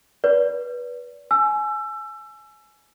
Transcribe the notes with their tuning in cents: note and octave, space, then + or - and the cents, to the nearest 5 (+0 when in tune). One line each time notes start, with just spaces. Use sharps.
B4 -20 D5 -30
G#5 +25 E6 +25